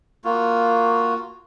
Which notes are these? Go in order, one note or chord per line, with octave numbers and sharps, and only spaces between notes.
A#3 F4 F#4